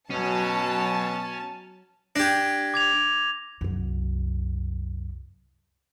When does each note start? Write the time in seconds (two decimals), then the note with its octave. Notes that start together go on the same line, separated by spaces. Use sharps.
0.11 B2 F#3 C#4 A5
2.16 D4 G4 G#6 A#6
2.74 D6 G#6 F7
3.61 C2 F#2